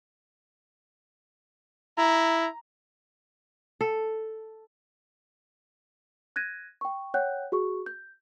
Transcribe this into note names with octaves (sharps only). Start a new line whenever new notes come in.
E4 A#5
A4
F#6 G#6 A#6 D#7
G5 C#6
C#5 F#5 G5 F#6 G6
F#4 G#4 C#6
G6